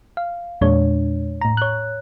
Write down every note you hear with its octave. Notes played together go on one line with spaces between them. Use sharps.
F5
E2 A#2 G#3 D4 C#5
A2 A#5
C#5 F#6